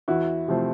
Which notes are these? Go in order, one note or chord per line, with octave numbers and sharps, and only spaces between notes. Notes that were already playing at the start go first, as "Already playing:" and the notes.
E2 E4 F#4
C3 F3 A3 C4